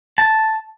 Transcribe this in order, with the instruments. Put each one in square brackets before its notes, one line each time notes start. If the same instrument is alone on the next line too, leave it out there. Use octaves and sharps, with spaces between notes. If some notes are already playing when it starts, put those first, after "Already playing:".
[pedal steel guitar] A5